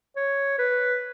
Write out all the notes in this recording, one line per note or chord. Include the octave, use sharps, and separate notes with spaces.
C#5
B4